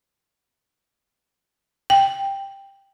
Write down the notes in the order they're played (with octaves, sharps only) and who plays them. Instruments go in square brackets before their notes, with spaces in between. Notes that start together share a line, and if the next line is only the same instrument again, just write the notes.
[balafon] G5